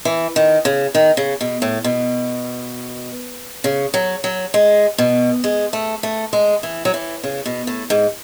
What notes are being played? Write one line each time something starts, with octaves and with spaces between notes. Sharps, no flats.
E3
D#3
C#3
D#3
C#3
B2
A2
B2
C#3
F#3
F#3
G#3
B2
G#3
A3
A3
G#3
E3
F#3
E3
C#3
B2
A2
G#2